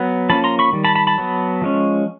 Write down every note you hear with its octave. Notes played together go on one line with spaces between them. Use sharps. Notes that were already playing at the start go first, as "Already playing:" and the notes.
Already playing: F#3 B3
F3 A#3 C#4 A5 B5
A#5 C6
B5 C#6
D#3 G3
A5 B5
A5 B5
A5 B5
F#3 B3
F3 G#3 C#4